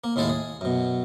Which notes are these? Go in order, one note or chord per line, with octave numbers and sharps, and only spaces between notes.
A#3
D#2 A2 G#3 E4 A4 F5
G#4
F#2 B2